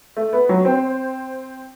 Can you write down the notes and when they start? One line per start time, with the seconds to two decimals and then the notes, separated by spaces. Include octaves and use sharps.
0.17 A3
0.33 B3
0.49 F#3 F#4
0.65 C4 C5